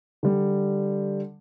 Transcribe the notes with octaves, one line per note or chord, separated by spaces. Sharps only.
D3 G3